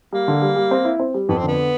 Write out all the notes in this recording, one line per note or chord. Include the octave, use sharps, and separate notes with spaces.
G3 A#3
D3
G3
G3
C4
E4
C4
G3
F2 B3
C4
D3 B3